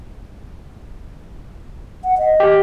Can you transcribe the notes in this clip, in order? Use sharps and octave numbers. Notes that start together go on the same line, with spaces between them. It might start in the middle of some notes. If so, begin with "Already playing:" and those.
F#5
D#5
G4